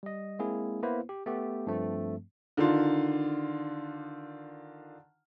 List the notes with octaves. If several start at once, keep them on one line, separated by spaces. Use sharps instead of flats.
G3 D#5
G#3 A#3 C4 E4 G#4
A#3 B3 E4 B4 C5
G4
A3 B3 G4
G2 F3 A3 C4
D3 D#3 D4 F4